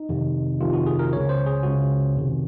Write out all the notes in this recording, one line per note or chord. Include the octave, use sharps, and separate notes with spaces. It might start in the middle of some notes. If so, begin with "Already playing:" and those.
Already playing: D#4
F2 C3 D#3
F2 C3 D#3 F4
F#4
G#4
A#4
C#2 C#3 C#5
C5
G#4
C#2 C#3 F#4
F2 C3 D#3